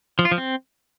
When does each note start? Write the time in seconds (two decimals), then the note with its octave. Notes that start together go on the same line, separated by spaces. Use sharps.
0.19 F3
0.25 F4
0.31 F3
0.38 C4